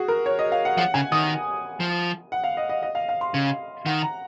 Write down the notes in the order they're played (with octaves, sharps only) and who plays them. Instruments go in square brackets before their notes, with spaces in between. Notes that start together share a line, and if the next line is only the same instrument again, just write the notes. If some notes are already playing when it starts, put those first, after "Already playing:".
Already playing: [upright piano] F#4 G#4
A#4
C#5
D#5
F5
F#5
[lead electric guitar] F3 [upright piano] F#5
[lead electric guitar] C#3 [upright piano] G#5
[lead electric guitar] D#3 [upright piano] D#6
[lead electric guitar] F3
[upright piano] F#5
F5
D#5
D#5
D#5
F5
F5
C6
[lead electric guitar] C#3
[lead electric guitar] D#3 [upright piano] F#5
[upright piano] A#5